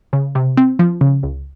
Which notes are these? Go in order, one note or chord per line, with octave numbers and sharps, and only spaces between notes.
C#3
C3
C4
F3
C#3
C#2